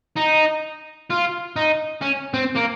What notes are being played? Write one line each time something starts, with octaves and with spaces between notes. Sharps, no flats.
D#4
F4
D#4
C#4
C4
A#3